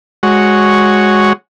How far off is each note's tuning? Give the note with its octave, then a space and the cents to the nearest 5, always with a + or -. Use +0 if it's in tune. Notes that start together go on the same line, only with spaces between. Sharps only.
G#3 +0 F#4 +0 C#5 +0